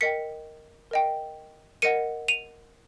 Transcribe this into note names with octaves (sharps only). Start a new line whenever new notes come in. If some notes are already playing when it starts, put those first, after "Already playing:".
A#4 D#5 G5 B6 C#7
A#4 D#5 G5
A#4 D#5 F#5 C#7 D#7
D#7 F7